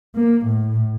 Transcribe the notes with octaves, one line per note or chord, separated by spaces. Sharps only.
A#3
A2